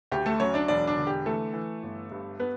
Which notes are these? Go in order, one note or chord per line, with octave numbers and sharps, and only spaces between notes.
D2 G4
A3 A4
F#3 C#4 C#5
D4 D5
E1 D4 D5
D4 D5
D3
G4
E3 A3 A4
E3
G1
G2
B3 B4